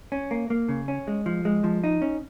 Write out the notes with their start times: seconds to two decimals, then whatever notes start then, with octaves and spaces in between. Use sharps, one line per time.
0.12 C#4
0.31 A#3
0.50 A#3
0.69 C#3
0.88 C#4
1.07 G#3
1.26 F3
1.45 G#3
1.64 F3
1.84 D#4
2.02 C#4